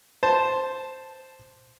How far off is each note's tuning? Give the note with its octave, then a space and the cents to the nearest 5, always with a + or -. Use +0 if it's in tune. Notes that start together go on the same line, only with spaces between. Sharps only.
C5 +0 A5 +0